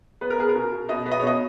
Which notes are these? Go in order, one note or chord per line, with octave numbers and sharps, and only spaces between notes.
B3 B4
A#4
B3 G#4
A#4
B2
B2
B2 D#5
B3
D#5
C#5
B2 D#5